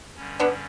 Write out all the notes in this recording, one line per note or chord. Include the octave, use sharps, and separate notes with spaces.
G2 D3 G3 C#4
B3 D4